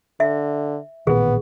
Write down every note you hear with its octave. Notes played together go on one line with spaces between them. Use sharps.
D3 E5
A1 A#2 D#3 B3 G#4